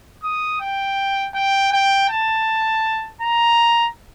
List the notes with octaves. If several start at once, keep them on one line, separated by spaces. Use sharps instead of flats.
D#6
G5
G5
G5
A5
A#5